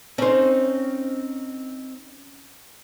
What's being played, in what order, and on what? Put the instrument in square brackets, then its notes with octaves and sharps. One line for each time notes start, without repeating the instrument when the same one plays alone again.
[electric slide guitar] C4 D#4 [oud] C#4 C5